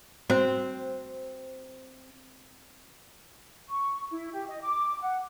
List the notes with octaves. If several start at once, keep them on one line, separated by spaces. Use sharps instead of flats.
C4 F#4 C5
C#6
E4
G4
D#5
D6
F#5